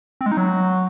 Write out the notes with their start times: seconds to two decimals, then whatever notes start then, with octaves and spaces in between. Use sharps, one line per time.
0.21 C4
0.26 G#3
0.32 D#4
0.37 F#3